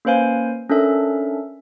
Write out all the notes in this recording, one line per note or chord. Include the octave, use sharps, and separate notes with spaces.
A#3 C#4 B4 C5 F5 G#5
C#4 D4 A4 A#4 E5